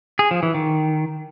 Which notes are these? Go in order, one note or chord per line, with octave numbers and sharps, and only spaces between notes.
G#4
F3
E3
D#3